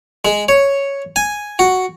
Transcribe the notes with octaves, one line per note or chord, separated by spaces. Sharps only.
G#3
C#5
G#5
F#4